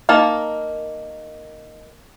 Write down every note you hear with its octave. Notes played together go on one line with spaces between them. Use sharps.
A#3 D#4 A#4 A5